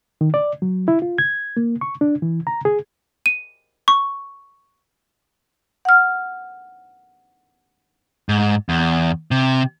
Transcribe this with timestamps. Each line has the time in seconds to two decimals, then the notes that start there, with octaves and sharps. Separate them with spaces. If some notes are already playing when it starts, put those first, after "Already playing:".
0.21 D#3
0.34 D5
0.62 F#3
0.88 E4
1.02 F4
1.18 G#6
1.57 A#3
1.81 C#6
2.01 D4
2.22 E3
2.47 A#5
2.65 G#4
3.26 D#7
3.88 C#6
5.85 F#5 F6
8.29 G#2
8.69 E2
9.31 C3